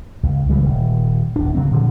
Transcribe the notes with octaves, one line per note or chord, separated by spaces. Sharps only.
C#2
C#3 E3 G3 G#3
D#1
D1 D4
C#3 F#3 C4
A#2 D3 F3